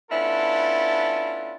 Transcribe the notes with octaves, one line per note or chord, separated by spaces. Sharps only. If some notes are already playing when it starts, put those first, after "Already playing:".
B3 C#4 D4 E4 F4 A4